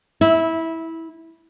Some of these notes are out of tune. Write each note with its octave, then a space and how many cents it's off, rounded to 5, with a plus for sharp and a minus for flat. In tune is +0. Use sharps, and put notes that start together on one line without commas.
E4 -15